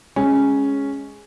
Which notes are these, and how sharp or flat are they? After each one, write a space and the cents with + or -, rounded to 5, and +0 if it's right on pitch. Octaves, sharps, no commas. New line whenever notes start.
G#3 +0 C#4 +0